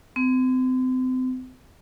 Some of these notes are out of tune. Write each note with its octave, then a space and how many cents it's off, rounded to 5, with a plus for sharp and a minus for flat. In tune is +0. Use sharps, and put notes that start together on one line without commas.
C4 -35